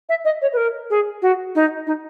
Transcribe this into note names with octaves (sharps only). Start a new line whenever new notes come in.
E5
D#5
C#5
B4
A#4
G#4
F#4
D#4
D#4